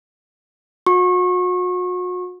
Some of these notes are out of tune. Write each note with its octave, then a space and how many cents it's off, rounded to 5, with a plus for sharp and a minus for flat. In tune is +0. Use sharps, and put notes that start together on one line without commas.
F#4 -40 C#6 -30